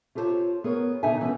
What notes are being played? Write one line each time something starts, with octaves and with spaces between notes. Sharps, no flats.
F4 G4 A4 A#4 C5 C#5
B3 G#4 A#4 C#5
B2 D3 D#4 D#5 E5 G#5
E3 B3 C#4 B4